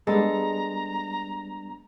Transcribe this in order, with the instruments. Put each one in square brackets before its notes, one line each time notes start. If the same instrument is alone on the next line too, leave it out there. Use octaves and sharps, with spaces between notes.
[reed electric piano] G3 B3 D4 [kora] G#3 A4 [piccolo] A#5